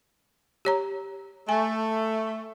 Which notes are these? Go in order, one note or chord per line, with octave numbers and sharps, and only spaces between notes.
G4 C#5 A#5
A3 G#5